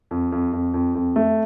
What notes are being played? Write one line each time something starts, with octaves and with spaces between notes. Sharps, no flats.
F2
F2
F2
F2
F2
A3